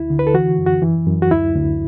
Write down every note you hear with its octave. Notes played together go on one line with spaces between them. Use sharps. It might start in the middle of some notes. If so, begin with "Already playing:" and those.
Already playing: D2 E4
D3
B4
A4
E3 F#4
F#2
F#4
E3
F#2
F#4
D2 E4
D2